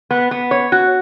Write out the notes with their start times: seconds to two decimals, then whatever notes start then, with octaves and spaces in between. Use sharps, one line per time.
0.11 B3
0.31 B3
0.51 C#5
0.72 F#4